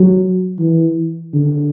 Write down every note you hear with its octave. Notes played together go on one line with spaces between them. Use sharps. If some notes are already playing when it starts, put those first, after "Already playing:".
Already playing: F#3
E3
D3